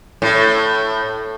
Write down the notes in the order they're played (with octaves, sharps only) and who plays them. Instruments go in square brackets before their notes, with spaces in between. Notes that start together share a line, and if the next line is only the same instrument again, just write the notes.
[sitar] A2